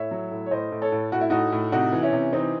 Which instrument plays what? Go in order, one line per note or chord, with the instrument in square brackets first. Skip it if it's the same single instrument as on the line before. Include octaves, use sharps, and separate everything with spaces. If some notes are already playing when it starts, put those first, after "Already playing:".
Already playing: [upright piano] A2 C#5 E5
F#3
A2
C#5
A2 C5 D#5
A2
A4 C#5
A2
A2 F#4
E4
A2 D#4 F#4
A2
C3 D#4 F#4
E3
C#4 E4
C3
E3 C4 D#4